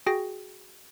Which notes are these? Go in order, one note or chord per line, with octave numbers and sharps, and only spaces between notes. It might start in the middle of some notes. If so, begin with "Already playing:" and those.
F#4 G#4 G5 A#6